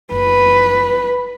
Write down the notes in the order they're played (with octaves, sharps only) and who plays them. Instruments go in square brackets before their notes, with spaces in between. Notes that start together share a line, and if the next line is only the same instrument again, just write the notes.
[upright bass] F#1 [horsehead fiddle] B4